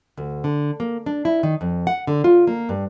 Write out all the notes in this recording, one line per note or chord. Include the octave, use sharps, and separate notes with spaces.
D2
D3
A#3
D4
E4
D#3
F2
F#5
D3
F4
A#3
G2